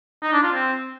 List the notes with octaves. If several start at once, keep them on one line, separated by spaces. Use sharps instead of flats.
D#4
D4
F4
C4